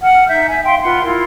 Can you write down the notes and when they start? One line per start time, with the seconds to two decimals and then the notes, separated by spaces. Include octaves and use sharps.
0.03 F#5 F6
0.28 D#4 E5 G6
0.49 E5 G#5
0.63 E5 F5 G5 C6
0.83 F4 B4 F#5 C6
1.03 E4 F4 A#4